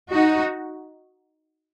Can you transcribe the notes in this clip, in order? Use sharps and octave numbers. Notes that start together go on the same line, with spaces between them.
D#4 F#4